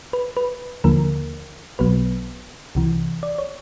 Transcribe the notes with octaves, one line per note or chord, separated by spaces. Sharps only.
B4
B4
D#2 D3 F3 A#3 A#4
B1 B2 F#3 B3 B4
C2 C3 E3
D5
C#5